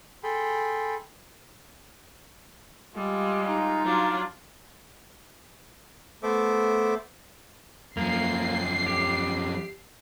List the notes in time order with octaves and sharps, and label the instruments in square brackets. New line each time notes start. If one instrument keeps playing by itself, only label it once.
[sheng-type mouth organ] G#4 A4 G5 B5 C6
[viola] G3 [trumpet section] G#3 F4
[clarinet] D#4
[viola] F#3 D4 [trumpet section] F4
[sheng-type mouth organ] A3 B3 A4 C5 E5 D6
[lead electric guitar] F#2 F3 [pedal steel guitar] A#3 [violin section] C7
[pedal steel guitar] G4